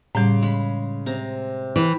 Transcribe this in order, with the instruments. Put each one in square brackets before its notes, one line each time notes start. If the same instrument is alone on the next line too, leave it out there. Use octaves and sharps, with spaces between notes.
[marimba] A2 G3 [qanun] C#3 C6 D6
[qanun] G#3 B5
C3 A#5
[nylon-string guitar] E3 [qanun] G5 B5